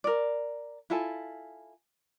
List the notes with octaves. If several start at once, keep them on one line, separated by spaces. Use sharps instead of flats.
A#4 D5
E4 F4 A4 G#5